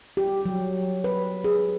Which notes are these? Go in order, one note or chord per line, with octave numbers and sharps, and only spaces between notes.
G4
F#3
B4
G#4